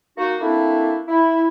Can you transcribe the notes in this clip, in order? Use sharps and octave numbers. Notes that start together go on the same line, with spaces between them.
A#3 D#4 F#4
A3 A#3 C4 D4 E4
E4